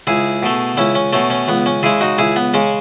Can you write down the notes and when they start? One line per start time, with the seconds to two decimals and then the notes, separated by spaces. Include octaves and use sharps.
0.07 C#2 E4 G#4
0.43 B2 A3
0.77 C#2 C#4 E4
0.95 C#4
1.13 B2 A3 C#4
1.30 C#4
1.48 C#2 B3
1.66 C#4
1.83 C#3 G#3 E4 G#4
2.01 D#4 F#4
2.18 C#2 E4 G#4
2.36 B3
2.54 C#3 G#3 C#4